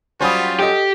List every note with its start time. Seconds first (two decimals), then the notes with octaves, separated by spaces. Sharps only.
0.21 F#3 G3 C#4 F4 C5 B5 D#6
0.60 G4 A4 D#5